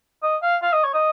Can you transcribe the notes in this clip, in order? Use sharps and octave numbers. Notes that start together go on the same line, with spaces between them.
D#5
F5
F5
D#5
C#5
D#5